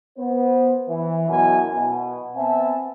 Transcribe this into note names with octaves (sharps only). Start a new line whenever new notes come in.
B3 C5
E3
F#2 B2 E4 G#5
B2
B3 C4 E5 G#5 A5